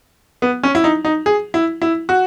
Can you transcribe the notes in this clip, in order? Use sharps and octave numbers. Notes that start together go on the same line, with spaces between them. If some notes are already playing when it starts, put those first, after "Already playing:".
B3
C#4
E4
D#4
D#4
G#4
E4
E4
F#4